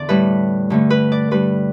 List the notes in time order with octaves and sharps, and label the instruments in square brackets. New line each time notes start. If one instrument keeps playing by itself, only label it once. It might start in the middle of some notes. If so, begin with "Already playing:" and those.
Already playing: [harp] E2 D3 D5
A2 G3 B4
G2 D3 A3
B4
D5
G2 G3 B4